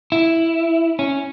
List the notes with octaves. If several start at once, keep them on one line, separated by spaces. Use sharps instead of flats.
E4
C#4